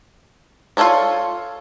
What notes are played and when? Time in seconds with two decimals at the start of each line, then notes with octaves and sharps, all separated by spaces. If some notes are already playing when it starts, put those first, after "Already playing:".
0.77 F4 F#4 A4 C#5 D5